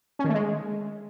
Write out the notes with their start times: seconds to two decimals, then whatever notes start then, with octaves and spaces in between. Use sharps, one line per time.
0.19 C#4
0.24 D#3
0.29 A3
0.34 G#3